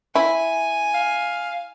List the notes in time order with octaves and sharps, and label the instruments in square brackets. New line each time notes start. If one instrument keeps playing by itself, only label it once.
[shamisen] E4 [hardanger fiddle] G#5
[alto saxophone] F5